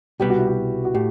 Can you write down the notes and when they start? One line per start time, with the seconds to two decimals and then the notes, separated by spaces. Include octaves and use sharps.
0.20 C2 B2 G3 B3 G4
0.30 F#4
0.38 E4
0.48 F#4
0.85 F#4
0.94 A2 G4